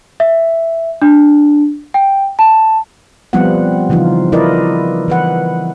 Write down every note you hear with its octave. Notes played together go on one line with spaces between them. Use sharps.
E5
D4
G5
A5
F3 G3 B3 C4 F4 F#5
C#3 E3 F3 D#4 F4
E4 F4 A#4 B4 D5 D#5
E3 B4 F#5